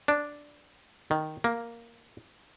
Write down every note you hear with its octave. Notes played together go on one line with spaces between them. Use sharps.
D4
D#3
A#3